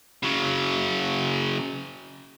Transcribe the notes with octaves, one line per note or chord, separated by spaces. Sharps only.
C#3 F#3